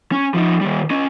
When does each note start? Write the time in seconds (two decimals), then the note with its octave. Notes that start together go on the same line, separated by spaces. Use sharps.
0.12 C#4
0.34 F3 D#4
0.61 D#3 G3
0.91 C#4 D#5